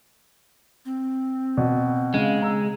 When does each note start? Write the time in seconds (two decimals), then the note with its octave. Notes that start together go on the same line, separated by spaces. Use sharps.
0.85 C4
1.57 B2
2.14 C#3 G#3 F5
2.42 A#5 E6